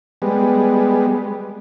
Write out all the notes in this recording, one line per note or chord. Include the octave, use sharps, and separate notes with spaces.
G3 G#3 B3